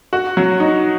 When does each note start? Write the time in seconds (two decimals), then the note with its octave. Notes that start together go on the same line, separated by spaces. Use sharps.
0.13 F#4
0.37 F#3
0.60 D#4